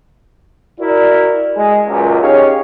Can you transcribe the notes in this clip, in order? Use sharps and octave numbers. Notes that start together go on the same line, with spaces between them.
E4 F#4 A#4 D5
G#3
C#2 F#2 A#2
C#4 D#4 G4 G#4 C#5 F5